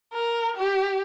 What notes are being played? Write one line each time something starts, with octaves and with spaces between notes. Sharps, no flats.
A#4
G4